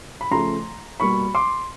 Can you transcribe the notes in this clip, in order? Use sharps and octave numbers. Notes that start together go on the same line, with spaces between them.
B5
C#3 F3 A3 A#5 C6
B2 G3 A#3 B5 C#6
C6 D6